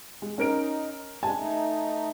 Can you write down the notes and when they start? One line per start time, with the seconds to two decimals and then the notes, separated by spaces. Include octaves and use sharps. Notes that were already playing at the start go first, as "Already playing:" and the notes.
0.22 G#3
0.38 C#4 D#4 A#4 D7
1.23 G#3 D4 G#5 A5
1.37 A3 D#4